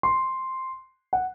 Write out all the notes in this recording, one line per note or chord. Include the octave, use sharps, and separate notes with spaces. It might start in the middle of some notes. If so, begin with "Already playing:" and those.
C6
F#5